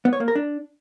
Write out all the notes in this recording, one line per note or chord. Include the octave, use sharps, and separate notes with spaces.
B3
C#5
A#3
A#4
D4